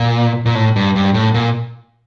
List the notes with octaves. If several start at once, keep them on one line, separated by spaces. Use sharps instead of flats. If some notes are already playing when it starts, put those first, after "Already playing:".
Already playing: A#2
A#2
A2
G2
G2
A2
A#2